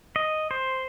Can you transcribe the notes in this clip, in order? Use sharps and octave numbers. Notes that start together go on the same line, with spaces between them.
D#5
C5